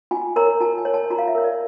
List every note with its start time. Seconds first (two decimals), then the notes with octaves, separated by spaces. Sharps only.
0.11 F4 G#5
0.36 A#4 C#5 A#5
0.60 F4 A5
0.78 G#5
0.85 A#4 C#5
0.94 A5
1.11 F4 A#5
1.19 F5
1.28 E5
1.35 A#4 C#5
1.44 D5